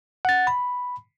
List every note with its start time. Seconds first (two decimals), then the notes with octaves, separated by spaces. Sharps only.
0.25 F#5 A6
0.47 B5